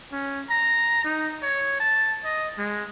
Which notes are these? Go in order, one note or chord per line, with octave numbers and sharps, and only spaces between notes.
C#4
A#5
D#4
C#5
A5
D#5
G#3